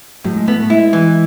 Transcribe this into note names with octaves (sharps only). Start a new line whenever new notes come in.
A2 F#3
G#3
A3 B3
A3
G#3 E4
E3